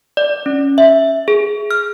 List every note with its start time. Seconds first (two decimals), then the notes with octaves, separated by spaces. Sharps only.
0.17 D5
0.46 C#4
0.78 E5
1.28 G#4
1.71 F6